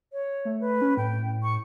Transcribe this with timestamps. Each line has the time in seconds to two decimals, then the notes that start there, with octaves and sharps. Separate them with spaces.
0.13 C#5
0.45 A3
0.61 B4
0.81 C#4
0.97 A2 G5
1.43 C#6